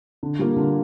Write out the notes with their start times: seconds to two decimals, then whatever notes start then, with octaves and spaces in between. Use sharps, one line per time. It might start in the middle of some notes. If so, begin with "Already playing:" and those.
0.23 D3
0.39 G3 A#3 F4
0.56 D3